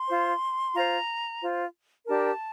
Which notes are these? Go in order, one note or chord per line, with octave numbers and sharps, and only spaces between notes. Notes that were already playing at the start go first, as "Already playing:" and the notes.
Already playing: C6
F4 C5
F4 C5 A#5
F4 C5
D4 G4 A#4 A5